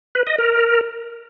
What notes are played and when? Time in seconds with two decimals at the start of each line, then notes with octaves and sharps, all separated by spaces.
0.15 B4
0.27 D#5
0.38 A#4